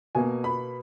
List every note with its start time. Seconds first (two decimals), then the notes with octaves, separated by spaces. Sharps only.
0.15 B2 A#3 G#5
0.44 B5